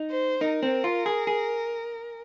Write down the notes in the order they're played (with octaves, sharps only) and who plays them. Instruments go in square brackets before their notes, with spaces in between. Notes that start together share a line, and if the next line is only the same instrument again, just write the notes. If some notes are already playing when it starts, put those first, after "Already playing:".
Already playing: [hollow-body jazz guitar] D#4
[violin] C5
[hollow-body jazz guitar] D#4 [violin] A#4
[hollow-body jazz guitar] C4
F4
G#4
G#4